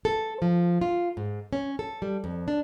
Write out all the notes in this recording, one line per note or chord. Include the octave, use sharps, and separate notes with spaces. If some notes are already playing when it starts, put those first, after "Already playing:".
A4
F3
F4
G#2
C#4
A4
G3
F2
D4